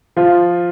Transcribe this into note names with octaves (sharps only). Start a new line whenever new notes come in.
F3 F4